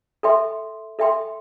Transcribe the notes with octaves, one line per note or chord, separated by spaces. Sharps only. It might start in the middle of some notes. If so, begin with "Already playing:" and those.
A4 E5 G5 C6
A4 E5 G5 C6